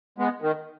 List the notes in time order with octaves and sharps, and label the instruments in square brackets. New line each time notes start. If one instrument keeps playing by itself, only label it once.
[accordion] G#3 B3
D#3